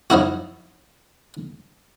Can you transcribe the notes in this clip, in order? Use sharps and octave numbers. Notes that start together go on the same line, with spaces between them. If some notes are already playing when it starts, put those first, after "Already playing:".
F3 D#4 E4 F#4